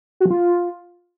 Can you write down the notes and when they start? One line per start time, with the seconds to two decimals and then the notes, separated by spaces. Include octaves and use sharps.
0.20 F#4
0.25 F3
0.31 F4